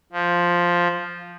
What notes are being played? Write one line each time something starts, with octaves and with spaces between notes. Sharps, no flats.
F3